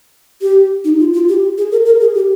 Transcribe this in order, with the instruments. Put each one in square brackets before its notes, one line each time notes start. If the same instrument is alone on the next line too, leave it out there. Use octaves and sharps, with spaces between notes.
[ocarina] G4
D#4
F4
F4
G4
G#4
A#4
A#4
G#4
G4